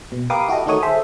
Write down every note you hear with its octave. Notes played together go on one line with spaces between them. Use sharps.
B2
G4 A#4 B4 F5 D6 D#6
E4 F#4 G4 A4 D#5
D#3 A3 D#4 F#4 C#5 D#6
G#4 A4 C5 E5